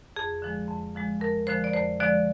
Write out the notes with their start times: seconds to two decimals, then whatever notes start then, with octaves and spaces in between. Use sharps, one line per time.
0.16 F2 G#4
0.42 D3 F3 G#3
0.69 F2
0.95 D3 F3 G#3
1.21 F2 A#4
1.47 D3 F3 G#3 C5
1.64 D5
1.74 F2 C5
2.00 D3 F3 G#3 D5